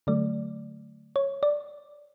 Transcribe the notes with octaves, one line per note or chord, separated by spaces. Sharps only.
D3 F#3 A3 D5
C#5
D5